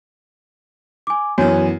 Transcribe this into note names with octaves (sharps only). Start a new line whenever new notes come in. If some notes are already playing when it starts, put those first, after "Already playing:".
G#5 D6
F#2 E3 B3 F#4 C#5 G#5